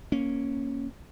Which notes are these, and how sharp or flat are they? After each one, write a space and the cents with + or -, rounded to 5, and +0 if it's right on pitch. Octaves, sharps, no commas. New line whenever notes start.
A#3 +10 C#4 +0